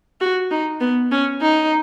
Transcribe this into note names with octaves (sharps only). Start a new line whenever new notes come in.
F#4
D#4
B3
C#4
D#4